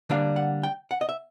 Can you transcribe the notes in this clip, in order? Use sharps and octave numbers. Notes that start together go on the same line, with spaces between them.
D3 G3 A#3 D4 F5
F#5
G5
F#5
D#5
E5